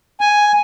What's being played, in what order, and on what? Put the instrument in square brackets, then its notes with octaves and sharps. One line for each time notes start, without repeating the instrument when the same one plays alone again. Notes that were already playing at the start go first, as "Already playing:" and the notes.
[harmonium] G#5